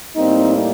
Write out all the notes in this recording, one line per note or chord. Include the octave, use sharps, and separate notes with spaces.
A2 G3 A#3 C4 D#4